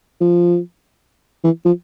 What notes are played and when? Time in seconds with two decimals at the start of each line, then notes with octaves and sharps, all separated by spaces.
0.21 F3
1.44 E3
1.65 F3